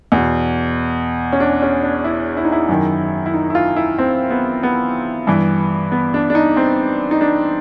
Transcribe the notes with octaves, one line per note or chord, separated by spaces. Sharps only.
E2 B2
C#4
D4
C#4
D4
E4
E4
D#4
E4
F#2 D#3
E4
D#4
E4
F4
E4
C4
B3
B3
G2 E3
B3
D4
D4
D#4
C4
D#4
D4